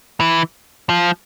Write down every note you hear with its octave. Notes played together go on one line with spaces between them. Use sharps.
E3
F3